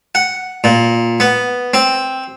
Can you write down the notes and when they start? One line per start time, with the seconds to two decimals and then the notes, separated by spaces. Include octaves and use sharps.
0.15 F#5
0.64 A#2
1.20 B3
1.74 C4